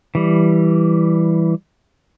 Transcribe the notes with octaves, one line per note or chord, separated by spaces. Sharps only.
E3 G3